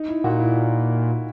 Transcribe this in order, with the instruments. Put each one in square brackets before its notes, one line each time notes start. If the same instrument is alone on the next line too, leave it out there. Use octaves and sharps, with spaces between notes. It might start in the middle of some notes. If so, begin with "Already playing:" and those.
Already playing: [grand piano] D#4
E4
[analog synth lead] A#2 [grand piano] F#4
[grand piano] E4